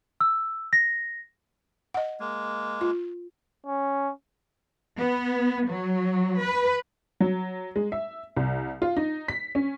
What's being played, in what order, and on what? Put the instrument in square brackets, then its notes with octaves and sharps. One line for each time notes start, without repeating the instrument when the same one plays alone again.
[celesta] E6
A#6
[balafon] D#5 F#5
[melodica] G#3 A#3
[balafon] F4
[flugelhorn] C#4
[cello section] B3
F#3
B4
[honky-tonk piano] F#3
G#3
E5
C2
F4
D#4
B6
C#4